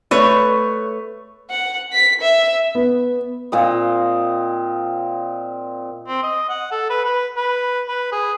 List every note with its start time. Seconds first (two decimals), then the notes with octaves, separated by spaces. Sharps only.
0.11 A3 B4 C#5
1.50 F#5
1.93 B6
2.21 E5
2.75 B3
3.52 A#2 C4 D#5
6.08 C4
6.23 D#5
6.49 F#5
6.72 A4
6.90 B4
7.05 B4
7.37 B4
7.88 B4
8.13 G#4